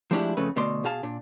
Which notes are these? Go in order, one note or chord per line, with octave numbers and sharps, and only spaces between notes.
F3 G#3 A3 D4 E4 G4
F2 C#3 A3 B4
D2 B2 A3 D5 C6
B2 G#4 F5 A5
A#2 D4